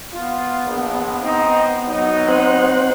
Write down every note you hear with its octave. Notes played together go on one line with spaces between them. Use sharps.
B3 F4
A#1
C4 D#4
F#3 D#4
C4 C5 F#5